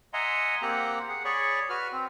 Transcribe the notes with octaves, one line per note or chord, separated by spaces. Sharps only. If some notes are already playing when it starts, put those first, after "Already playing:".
D#5 E5 F#5 G#5 A#5 C6
A#3 C4 G4 F#5 A#5 F#6
G#4 F#5
G#4 C#5 D5 B5 C#6
F#4 B4 F6
C4